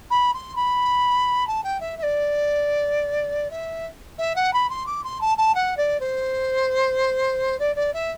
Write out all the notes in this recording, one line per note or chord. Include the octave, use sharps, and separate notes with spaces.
B5
C6
B5
A5
G5
E5
E5
D5
E5
E5
F#5
B5
C6
D6
C6
A5
A5
F#5
D5
C5
D5
D5
E5